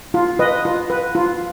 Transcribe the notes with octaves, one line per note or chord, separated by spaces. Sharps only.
F4
B4 D#5
F4
B4
F4